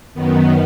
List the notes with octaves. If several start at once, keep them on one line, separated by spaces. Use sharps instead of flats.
F#2 D#3 B3